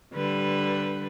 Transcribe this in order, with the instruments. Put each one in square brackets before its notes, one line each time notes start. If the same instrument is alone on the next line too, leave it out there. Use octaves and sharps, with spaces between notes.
[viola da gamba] D3 G3 B4